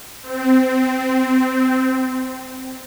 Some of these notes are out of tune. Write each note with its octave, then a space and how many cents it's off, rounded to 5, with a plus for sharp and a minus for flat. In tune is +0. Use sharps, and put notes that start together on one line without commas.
C4 -15